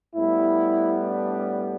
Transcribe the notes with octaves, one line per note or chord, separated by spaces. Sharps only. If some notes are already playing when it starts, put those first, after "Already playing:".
A2 G3 B3 E4
D4